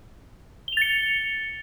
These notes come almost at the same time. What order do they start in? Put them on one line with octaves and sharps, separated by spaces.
G7 F7 A6 C#7